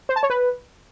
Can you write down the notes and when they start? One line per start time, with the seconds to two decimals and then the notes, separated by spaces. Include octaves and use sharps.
0.09 C5
0.16 A5
0.23 C#5
0.30 B4